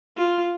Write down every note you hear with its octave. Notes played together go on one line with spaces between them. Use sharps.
F4